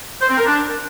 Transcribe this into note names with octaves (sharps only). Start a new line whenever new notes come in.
C5
C4
A#4
D4